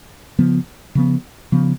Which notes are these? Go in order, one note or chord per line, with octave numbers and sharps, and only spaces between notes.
C#3 F3 B3
C#3 F3 B3
C#3 F3 B3